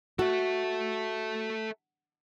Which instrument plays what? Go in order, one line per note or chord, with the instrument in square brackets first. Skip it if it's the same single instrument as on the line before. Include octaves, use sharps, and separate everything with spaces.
[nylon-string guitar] F#4 [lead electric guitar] A4 E5